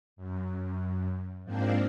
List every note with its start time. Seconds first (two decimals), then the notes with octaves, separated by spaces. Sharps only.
0.16 F#2
1.44 G#2 F3 A#3 C4 D4